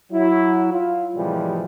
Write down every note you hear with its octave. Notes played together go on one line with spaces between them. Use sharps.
F#3 E4
F4
A2 C3 E3 F3 G3 G#3